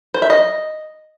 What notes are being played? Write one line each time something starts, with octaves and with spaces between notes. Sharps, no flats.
C5
E5
D#5